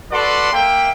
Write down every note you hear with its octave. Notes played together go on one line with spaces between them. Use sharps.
F#4 A4 B4 D5 F#5 C6
A#3 E5 G5